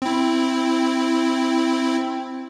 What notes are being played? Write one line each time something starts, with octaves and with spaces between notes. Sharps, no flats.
C4 E4